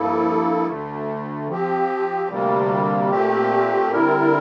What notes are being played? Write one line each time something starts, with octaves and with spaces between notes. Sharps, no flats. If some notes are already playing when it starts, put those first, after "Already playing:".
Already playing: G2 F3 A#3 E4 A4
D2 D3 A3
F3 C4 G4
D2 C3 G3 A#3
A#2 A3 C4 G4
D3 G3 C4 E4 A#4